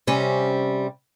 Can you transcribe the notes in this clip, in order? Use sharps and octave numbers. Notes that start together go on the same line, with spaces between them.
C3 G3 C#4